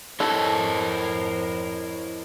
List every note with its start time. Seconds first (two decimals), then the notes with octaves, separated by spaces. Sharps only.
0.20 F2 E4 A4 A#4 C5 C#5 D#5